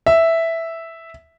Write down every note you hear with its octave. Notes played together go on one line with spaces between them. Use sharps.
E5